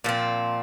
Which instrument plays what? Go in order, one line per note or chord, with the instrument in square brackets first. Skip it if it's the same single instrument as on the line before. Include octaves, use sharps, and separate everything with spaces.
[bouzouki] A#2 F3 C4